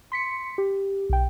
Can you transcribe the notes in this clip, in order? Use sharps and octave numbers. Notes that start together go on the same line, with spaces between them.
C6 B6 C#7
G4
B1 G5